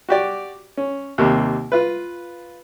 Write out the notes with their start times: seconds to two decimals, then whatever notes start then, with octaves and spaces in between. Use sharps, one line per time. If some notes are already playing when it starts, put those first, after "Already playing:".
0.09 F#4 G4 D5
0.77 C#4
1.18 D#2 C3 A#3
1.72 F4 B4